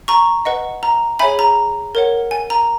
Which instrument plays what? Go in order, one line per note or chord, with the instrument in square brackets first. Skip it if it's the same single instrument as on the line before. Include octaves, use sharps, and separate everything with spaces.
[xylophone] A#5 C#6
B4 D#5 F#5
A#5
G#4 C#5 E5 G#5 B5
A#5
A#4 C#5 F#5
G#5
A#5